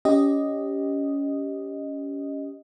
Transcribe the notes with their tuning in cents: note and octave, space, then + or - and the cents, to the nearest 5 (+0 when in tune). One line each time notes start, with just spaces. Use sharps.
C#4 +25 G4 +0 D#5 +0